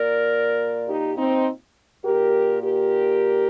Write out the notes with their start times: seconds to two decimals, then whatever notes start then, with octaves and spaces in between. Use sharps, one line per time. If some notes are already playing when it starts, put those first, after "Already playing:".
Already playing: A#2 A#4 D5
0.88 D#4 G4
1.17 C4 D#4
2.05 A#2 G4 A#4
2.63 G4 A#4